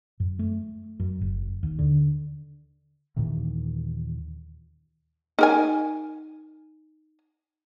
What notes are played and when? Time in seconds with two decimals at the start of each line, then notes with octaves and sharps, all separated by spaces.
0.20 F#2
0.39 A3
1.00 F#2
1.21 F#1
1.63 D#2
1.79 D3
3.16 D#2 A#2 D#3 E3
5.39 D#4 A#4 G#5